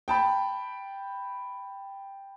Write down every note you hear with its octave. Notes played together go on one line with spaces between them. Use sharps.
G5 A5 B5